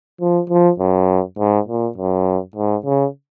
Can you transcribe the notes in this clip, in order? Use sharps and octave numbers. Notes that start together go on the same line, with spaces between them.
F3
F3
F#2
G#2
A#2
F#2
G#2
C#3